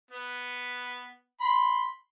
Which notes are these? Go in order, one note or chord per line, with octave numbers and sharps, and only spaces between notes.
B3
B5 C6